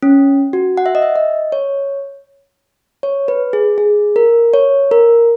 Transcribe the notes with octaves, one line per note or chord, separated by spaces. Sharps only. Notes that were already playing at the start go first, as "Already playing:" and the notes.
C#4
F#4
F#5
E5
D#5
E5
D#5
C#5
C#5
B4
G#4
G#4
A#4
C#5
A#4